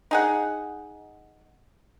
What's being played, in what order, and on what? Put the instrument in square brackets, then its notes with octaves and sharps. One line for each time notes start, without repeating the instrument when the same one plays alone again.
[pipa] D#4 G#4 F#5